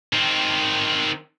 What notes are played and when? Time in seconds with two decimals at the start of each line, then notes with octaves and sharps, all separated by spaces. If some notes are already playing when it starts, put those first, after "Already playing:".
0.14 D#3 C4